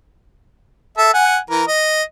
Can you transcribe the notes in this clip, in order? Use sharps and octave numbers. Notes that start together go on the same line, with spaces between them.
A4 E5
F#5 G#5
E3 A#4
D#5